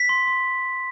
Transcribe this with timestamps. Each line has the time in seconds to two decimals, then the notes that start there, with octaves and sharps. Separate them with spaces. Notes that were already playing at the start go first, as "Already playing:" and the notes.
Already playing: B6
0.09 C6
0.27 C6